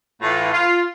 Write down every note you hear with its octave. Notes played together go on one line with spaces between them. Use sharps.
A2 E3 F4
F4